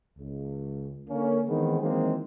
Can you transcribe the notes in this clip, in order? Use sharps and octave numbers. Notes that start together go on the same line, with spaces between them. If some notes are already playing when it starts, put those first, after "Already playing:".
C#2
D3 A#3 C#4
D#3 E3 G#3 B3 C4 G#4
D#3 E3 F#3 G#3 A#3 C4